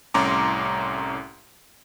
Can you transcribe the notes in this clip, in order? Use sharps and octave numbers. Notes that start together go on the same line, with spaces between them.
C2 A2 C#4 A#5 C6 D6